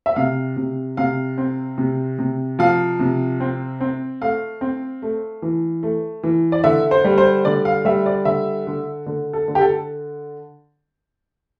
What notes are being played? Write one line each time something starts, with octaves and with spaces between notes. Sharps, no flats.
E5
C3 F5
C3
C3 F5
C4
C3
C3
F3 F5
C3
C4
C4
A3 F5
C4
A3
E3
A3
E3
D5
D3 E5
C5
G3
C5
D3 D5
F5
G3 E5
D5
D3 E5
D3
D3
A4
D3
G4
A4